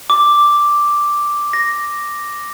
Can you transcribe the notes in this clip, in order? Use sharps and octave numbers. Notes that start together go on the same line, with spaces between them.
D6
A#6